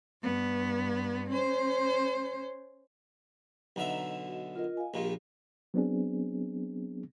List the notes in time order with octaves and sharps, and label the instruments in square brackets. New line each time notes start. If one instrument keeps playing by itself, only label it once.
[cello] G2 B3
C#4 C5
[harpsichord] B1 D3 E5 [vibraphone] D#5 A#5
[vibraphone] F#4 D#5
F4 A#4 D#5
D#5 F5 G#5
[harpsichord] A#1 A#2 [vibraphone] G4
[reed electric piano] F#3 B3 C4 D4 G#4